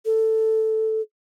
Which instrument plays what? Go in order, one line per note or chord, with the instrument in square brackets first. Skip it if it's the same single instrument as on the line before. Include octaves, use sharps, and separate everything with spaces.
[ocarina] A4